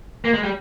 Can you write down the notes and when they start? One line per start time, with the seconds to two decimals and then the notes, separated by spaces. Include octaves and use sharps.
0.25 A#3
0.34 G#3
0.43 G3